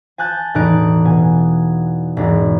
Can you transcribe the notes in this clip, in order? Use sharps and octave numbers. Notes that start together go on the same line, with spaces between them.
G#5 A5 F#6 G6 A6
E1 A2 E3 D#4 F#6 D7
B2 G#5
E1 G#2